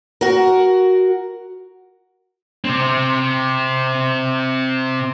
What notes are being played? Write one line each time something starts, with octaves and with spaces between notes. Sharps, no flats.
F#4 A#4
C3 C4